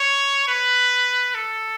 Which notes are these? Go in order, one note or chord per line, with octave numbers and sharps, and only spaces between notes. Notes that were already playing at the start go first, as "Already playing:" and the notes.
Already playing: C#5
B4
A4